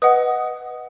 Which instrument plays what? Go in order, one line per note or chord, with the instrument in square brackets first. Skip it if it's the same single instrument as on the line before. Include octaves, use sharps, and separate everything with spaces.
[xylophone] B4 D#5 F#5 D#6